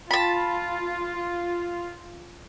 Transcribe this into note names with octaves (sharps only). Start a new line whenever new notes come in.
F4 A5 B5